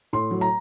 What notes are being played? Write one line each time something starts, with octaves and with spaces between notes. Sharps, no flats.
A2 C6
F#3
A#5